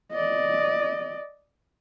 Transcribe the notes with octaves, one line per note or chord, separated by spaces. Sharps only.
D5 D#5